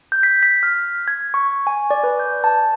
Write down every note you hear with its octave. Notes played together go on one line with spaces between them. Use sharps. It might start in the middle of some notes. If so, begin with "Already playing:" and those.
G6
B6
B6
F6
G#6
C#6
G#5
D5
B4
G6
A5